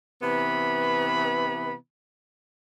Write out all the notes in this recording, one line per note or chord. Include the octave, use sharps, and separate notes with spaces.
C3 E3 B3 B5